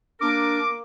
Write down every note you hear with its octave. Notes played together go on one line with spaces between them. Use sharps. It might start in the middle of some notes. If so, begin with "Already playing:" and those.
A#3 D4 A#4 D6